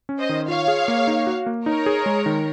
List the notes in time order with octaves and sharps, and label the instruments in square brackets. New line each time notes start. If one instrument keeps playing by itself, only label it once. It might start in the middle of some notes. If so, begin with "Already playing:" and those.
[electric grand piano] C#4
[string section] C5 D#5
[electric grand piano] D#3
[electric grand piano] F4 [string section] C#5 F5
[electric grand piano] G#4
A#3
D#4
F#4
A#3
[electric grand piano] D#4 [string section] A#4 C#5
[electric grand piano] G#4
G#3
D#3